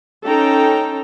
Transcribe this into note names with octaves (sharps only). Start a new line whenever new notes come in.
C#4 D#4 A4 G5 A#5